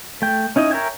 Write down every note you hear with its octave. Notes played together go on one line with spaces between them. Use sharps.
A3 G5
C#4 D#4 E4 D#5
A#4 C#5 E5 G5 G#5